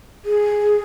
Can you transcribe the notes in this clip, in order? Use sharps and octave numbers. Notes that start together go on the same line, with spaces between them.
G#4